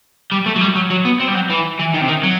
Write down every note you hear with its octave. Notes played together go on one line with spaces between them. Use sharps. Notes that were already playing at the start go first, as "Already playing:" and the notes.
G3
A3
F#3
G3
F#3
F#3
B3
C4
G3
F#3
E3
E3
D#3
C3
D#3
F#3